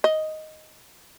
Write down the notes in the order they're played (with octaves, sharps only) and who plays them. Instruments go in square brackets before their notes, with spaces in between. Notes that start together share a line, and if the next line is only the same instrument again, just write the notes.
[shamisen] D#5